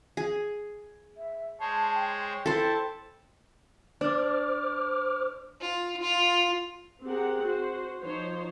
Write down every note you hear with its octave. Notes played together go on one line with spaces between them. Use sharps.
G#4
E5
G#3 C5 C#5 A5
G5
E4 A4 C5 A5
D4 C5 D6 F6
F4
F4
C4 G4 G#4 A#4 F#5
F#4 C5
F3 D#4 C5 C#5